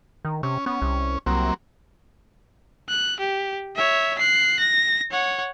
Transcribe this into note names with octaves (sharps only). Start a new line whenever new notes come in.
D#3
C3 C#4
B3 C#4
C2
C2 F#3 A#3 C4
F#6
G4
C#5 E5
F#6 C7
A#6
C#5 F#5